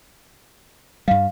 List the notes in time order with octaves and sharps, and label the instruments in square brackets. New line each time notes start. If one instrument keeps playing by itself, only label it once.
[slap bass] G2 G3 [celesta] F5